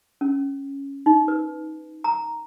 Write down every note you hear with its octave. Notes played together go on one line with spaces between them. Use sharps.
C#4
D#4
B4
A#5